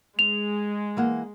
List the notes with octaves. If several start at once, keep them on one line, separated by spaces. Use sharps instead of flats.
G#3 F7
E3 A#3 F#5